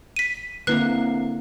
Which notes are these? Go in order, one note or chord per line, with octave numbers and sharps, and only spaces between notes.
B6 D#7
D3 A#3 C4 E4 B4 F#6 C7